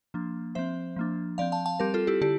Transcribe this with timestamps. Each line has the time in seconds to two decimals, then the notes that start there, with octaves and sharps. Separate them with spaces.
0.14 F3 A#3 D4
0.55 F3 C4 C5 E5
0.96 F3 A#3 D4
1.38 F3 C4 D5 F5
1.52 F5 A5
1.66 F5 A5
1.80 G3 C4 G4 A#4
1.94 F4 A4
2.07 E4 G4
2.21 D3 E4 G4